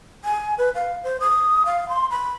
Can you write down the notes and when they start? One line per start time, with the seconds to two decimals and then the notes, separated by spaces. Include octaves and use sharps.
0.25 G#5
0.58 B4
0.75 F5
1.04 C5
1.21 D#6
1.66 F5
1.89 C6
2.11 B5